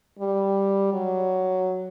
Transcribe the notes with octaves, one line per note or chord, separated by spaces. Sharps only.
G3
F#3